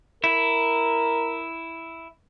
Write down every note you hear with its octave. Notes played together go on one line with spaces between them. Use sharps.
E4 A#4